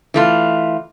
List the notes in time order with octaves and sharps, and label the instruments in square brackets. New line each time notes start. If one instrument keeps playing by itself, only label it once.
[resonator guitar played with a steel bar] E3 A3 F4